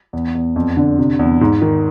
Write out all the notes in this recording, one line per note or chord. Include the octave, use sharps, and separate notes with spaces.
E2
E2
F2
D3
C3
E2
G#2
D#3